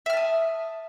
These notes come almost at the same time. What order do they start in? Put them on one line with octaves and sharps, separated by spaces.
E5 F6 A5 D#6